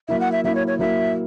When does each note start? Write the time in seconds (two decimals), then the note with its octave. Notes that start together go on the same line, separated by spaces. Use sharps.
0.08 F#3 A#3 E4 E5
0.20 F#5
0.32 E5
0.44 F#3 A#3 E4 E5
0.55 C#5
0.67 C#5
0.79 F#3 A#3 E4 E5